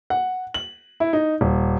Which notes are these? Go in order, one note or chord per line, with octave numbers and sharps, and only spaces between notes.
F#5
F#7
E4
D#4
D#1